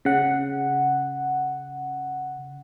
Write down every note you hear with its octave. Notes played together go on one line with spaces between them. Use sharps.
C#3 F#5